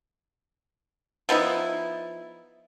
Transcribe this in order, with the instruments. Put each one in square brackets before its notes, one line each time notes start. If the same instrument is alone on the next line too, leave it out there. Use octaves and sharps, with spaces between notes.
[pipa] F3 B3 D#4 E4